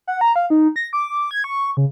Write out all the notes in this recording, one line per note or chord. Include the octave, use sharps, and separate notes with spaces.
F#5
A#5
F5
D#4
A#6
D6
G#6
C#6
C#3